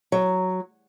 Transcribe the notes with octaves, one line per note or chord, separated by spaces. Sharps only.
F#3